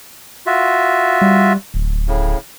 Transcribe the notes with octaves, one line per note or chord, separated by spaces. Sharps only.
F4 F#4 E5
G3
D1
A2 C#3